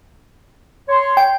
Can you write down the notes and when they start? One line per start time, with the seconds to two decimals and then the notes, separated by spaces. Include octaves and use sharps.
0.89 C#5 C6
1.17 G5